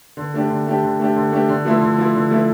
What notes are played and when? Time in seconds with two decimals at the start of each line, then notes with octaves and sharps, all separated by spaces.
0.17 D3
0.34 A3 D4 G4
0.50 D3
0.66 A3 D4 G4
0.83 D3
0.99 A3 D4 G4
1.16 D3
1.32 A3 D4 G4
1.49 D3
1.65 F3 A3 E4
1.81 D3
1.98 F3 A3 E4
2.15 D3
2.31 F3 A3 E4